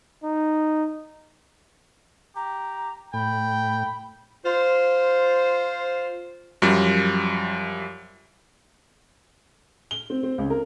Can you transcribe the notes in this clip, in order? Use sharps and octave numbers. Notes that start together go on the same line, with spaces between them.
D#4
G4 A#5
A2 G5 B5
F4 C5
F#2 F3 G3
G7
C4
C4
C#2
A#4